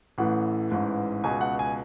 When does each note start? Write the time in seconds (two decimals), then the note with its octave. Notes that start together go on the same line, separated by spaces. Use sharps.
0.18 A1 A2 E3 F#5
0.71 A1 G#2 E3
1.24 C#2 B2 G#5
1.41 F#5
1.59 G#5